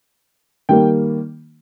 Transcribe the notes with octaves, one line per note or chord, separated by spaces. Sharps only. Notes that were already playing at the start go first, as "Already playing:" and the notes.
D#3 G3 A#3 G5